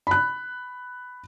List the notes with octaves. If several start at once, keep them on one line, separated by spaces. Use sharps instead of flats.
B5 F#6